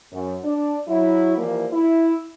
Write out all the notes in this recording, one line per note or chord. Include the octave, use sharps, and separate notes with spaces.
F#2
D4
F#3 E4
E3 F3 G3 A#3
E4